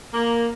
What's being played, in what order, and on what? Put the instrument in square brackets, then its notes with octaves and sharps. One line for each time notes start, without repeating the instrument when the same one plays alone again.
[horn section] A#3